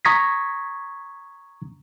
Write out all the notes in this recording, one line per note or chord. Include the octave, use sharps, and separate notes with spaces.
A#5 C#6 D#6 G#6 A#6 B6